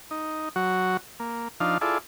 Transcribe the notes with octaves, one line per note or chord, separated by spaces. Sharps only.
D#4
F#3 F#4
A#3
F3 D4 D#4 F5
E4 F4 G#4 A4 D5